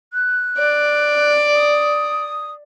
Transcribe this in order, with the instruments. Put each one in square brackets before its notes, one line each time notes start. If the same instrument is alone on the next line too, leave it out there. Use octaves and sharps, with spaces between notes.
[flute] F#6
[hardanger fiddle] D5
[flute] D#6